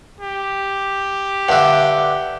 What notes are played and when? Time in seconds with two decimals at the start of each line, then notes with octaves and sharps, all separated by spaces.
0.21 G4
1.49 G2 D3 E5 F#5